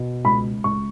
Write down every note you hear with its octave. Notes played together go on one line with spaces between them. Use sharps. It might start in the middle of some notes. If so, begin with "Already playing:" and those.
Already playing: B2
C#2 B5
C#2 C#6